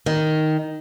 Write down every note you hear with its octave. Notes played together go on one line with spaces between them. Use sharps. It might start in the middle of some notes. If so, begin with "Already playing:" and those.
D#3